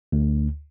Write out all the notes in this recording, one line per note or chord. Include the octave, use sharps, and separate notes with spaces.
D2